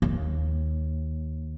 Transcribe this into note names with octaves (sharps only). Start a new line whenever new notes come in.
D#2